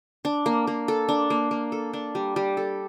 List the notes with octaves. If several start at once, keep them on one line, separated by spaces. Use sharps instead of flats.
D4
A#3
A#3
A4
D4
A#3
A#3
A4
D4
G3
G3
A4